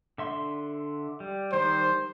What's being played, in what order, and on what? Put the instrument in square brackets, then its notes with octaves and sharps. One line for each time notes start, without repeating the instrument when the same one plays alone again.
[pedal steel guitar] D3 E5 C6
G3
[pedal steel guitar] D#3 G3 [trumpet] C5